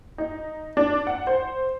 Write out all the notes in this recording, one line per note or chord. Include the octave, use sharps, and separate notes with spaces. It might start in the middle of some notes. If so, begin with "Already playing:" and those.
D#4
D4
F#5
C5